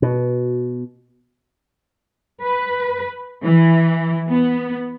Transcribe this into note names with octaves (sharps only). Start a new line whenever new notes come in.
B2
B4
E3
B3